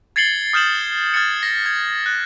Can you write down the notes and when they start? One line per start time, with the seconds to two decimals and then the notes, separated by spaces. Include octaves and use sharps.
0.16 G#6 A6 C7 C#7 F#7 G7
0.53 D#6 F6 G6 C7 E7 F#7
1.14 F6 G#6 A6 C#7
1.43 A#6
1.66 G#6
2.06 F#6